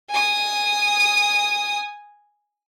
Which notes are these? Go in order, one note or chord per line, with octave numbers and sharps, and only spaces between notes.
G#5 D#6